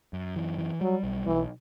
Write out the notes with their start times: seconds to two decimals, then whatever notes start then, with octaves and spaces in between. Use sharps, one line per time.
0.13 F#2
0.36 E3
0.59 E3
0.81 F#3 G3
1.03 B1
1.27 B1 E3